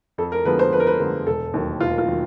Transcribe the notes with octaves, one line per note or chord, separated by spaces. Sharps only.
F2 A4
A#4
D3 F3 G#3 B3 B4
C5
F2 B4
A#4
B4
D3 F3 G#3 B3
E1 A4
D#2 D#3 F#3
E1 F4
F4
D#3 F#3